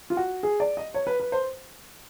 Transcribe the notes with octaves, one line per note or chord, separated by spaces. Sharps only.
F4
F#4
G#4
D5
D#5
C#5
B4
B4
C5